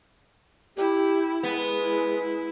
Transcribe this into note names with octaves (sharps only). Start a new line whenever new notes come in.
E4 G4
G#3 B3
E4
E4